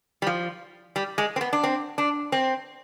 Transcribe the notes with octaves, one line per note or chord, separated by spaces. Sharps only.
G3
F3
G3
G#3
C4
B3
D4
C4
D4
C4